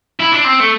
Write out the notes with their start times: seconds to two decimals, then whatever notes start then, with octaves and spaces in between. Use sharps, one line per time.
0.20 E4
0.32 D4
0.44 C4
0.60 A3